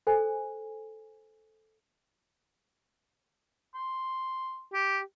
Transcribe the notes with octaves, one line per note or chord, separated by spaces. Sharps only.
A4 C5 G#5
C6
G4